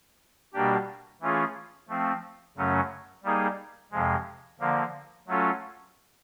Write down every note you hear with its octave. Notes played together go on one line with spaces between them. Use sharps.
B2 G3 A#3 D4 G4
E3 A3 C#4 F4 G#4
F3 A3 C4
F#2 C#3 F#3 A3 C#4
G3 A#3 D#4 G#4
F2 C3 F3 G#3
D3 F3 A#3
F#3 A3 C#4 F4 A4